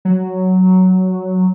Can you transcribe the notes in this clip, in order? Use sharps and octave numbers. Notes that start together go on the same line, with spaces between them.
F#3